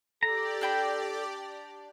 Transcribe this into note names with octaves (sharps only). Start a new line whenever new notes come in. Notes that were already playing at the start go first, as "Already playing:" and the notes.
G4 A4 D5 A#5
D4 G5 B5